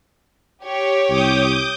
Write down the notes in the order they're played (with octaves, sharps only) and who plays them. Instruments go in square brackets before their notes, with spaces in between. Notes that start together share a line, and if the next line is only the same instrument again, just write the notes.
[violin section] G4 C#5
[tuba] C2 [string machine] D6 D#6 G6